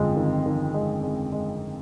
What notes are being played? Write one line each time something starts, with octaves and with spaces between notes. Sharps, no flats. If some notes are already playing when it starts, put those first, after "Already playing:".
Already playing: G1 F2 G#3
D#3
D#3
G#3
G#3
G#3